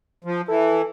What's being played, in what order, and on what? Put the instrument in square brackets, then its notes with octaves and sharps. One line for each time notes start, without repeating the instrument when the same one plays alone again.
[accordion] F3
[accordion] E3 [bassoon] A4